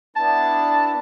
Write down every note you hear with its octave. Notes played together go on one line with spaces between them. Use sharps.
B3 D4 E4 A5